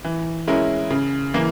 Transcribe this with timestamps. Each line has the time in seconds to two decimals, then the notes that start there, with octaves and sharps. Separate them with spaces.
0.05 E3
0.48 G#3 C#4 E4 A#4
0.91 C#3
1.34 E3 A#3